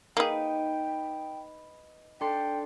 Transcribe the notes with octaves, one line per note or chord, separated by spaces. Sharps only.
A#3 D#4 G#4 B4 G5
D4 A4 G5 C6